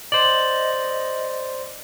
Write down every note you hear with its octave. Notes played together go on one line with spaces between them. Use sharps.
C5 D5 D#5 F#7